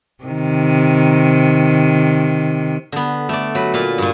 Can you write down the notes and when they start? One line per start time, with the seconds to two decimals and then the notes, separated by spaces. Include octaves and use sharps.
0.24 C3 D#3
2.92 D3 B3
3.29 A3 D5
3.55 F#3 B4
3.74 A#2 B4 D5 F5
3.98 G2 A#2